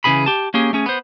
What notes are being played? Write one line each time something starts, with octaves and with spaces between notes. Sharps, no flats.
C#3 E3 G#4 B5
G4 A5
A#3 C#4 G4 G#4
A3 C#4 G#4
B3 C5